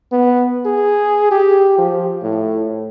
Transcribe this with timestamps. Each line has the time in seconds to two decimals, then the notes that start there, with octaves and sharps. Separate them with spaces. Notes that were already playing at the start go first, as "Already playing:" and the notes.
0.12 B3
0.66 G#4
1.31 G4
1.78 F3
2.23 A2